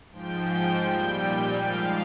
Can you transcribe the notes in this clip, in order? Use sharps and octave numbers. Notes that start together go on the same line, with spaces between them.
G#2 F3 G5
A#2 G3
G#2 F3 F5